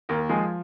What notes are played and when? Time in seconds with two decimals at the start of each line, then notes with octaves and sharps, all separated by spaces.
0.09 D#2 A#3 A#4
0.29 F3 G#3 G#4